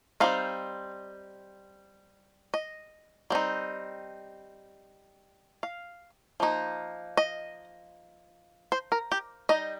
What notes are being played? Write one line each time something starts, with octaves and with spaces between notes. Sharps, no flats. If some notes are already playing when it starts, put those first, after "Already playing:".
G3 C4 D#4 F5
D#5
G3 C4 D#4
F5
F3 A#3 D#4
D#5
C5
A#4
G4
G3 D#4 D#5